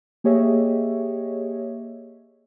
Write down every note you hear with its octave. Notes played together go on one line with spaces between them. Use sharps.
A#3 G4 G#4 C#5 D#5 E5